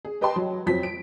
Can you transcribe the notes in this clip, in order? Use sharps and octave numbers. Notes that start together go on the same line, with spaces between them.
G#4
G4 B4 D#5 G5 A5 C6
F#3
F2 F3 F#3 C5 B6
D7